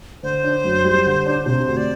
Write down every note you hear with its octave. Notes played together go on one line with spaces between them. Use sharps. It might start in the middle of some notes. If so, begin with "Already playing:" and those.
D3 C5
D4
F#2
G3
D3
D4
C3 C5
D2
D5